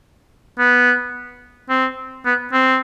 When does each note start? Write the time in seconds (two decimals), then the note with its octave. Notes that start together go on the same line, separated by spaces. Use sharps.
0.59 B3
1.69 C4
2.25 B3
2.53 C4